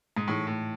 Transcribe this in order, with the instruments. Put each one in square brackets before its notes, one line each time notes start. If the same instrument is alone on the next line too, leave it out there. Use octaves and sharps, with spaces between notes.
[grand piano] G#2
[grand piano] A2 [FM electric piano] E3 A3 D#4 G#4
[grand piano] A2